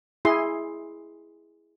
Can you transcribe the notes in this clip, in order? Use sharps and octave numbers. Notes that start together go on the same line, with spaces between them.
E4 G#4 C6